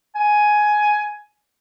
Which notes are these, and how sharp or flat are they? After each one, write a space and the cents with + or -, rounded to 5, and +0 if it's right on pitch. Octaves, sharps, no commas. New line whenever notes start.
G#5 +10